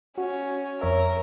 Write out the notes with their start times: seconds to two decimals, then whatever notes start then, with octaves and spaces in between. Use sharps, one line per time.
0.18 C#4 F#4
0.81 F2 A#4 C#5 E5